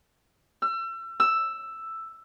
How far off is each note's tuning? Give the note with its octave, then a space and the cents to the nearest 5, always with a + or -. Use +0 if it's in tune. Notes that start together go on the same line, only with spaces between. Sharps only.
E6 +35
E6 +5